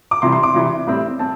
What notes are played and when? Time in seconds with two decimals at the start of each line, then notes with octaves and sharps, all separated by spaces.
0.11 D6
0.22 C3 E3 G3 C6
0.32 C6
0.43 D6
0.54 C3 E3 G3
0.87 A2 G3 C4
1.19 C4 A5